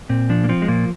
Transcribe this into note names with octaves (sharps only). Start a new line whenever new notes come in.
A#2 C4
F3 D4
A#3
F3 C4
G#3
A#2 A#3